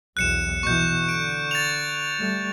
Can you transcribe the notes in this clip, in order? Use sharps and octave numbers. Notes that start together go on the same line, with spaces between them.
B1 E2 F#6 C#7 E7
B2 E3 C#6 G6
D3 D7
A6 F7
G3 A3